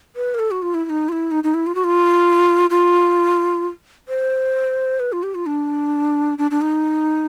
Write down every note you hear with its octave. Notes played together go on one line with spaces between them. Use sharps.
B4
A#4
A4
F#4
F4
E4
E4
D#4
F4
E4
D#4
D#4
E4
F4
F#4
F4
F4
C5
B4
F4
G4
F4
D4
D4
D4
D#4